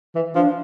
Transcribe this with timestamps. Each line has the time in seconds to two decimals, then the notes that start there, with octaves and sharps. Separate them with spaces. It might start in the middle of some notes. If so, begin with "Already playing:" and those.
0.15 E3
0.35 F3 D4